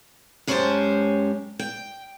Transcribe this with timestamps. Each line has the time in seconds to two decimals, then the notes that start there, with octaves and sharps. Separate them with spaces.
0.47 F#2 G#3 C#4 G4 C5 A5
1.59 G5